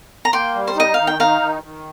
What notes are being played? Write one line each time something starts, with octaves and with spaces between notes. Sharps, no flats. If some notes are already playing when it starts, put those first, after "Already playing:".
A#5
A#3 G5 C6
G3
C5
D#4 D#5
D#3 F5
G5
D#4 F5 A#5
D#3
D#3